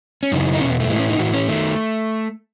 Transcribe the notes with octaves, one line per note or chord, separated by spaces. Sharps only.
C#4
F#2 C#3 E3 D#4
D#4
E2 B2 C#4
B3
A3
A2 E3 G#3
C#4
D#4
A2 E3 F#4
C#4
D#3 A3